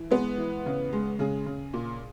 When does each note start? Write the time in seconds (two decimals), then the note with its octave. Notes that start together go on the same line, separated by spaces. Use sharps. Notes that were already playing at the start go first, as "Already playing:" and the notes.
Already playing: E3
0.11 G#3 B3
0.38 E3
0.66 C#3
0.93 G#3
1.19 C#3 G#4
1.46 C#3
1.73 A#2